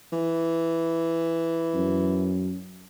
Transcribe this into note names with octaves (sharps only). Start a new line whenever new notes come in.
E3
F#2